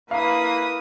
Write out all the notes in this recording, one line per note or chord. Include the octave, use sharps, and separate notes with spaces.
A#3 E4 B4 F5 D#6